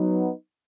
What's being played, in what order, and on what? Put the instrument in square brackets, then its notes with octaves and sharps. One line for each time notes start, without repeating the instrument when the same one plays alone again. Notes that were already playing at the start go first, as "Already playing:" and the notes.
Already playing: [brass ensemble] F#3 B3 D#4